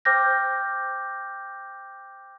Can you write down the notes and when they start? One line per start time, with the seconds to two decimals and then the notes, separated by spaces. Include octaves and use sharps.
0.05 C5 G5 D6 F6 G6 A#6